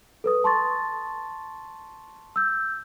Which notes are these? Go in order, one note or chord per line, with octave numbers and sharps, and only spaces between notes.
A4 B4 D#6
A5 C6 C#6 A6
E6 G6